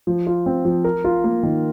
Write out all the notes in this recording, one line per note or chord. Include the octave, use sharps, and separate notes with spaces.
F3
F4
C4
F3
A#4
F4
A#3
D#3